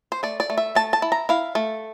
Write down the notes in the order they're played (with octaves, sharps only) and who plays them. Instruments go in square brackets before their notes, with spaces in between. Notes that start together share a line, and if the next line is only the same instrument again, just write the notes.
[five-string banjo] C5
A3 D5
D5
A3
E5
A3 A5
A5
E4
A#5
E4 F5
A3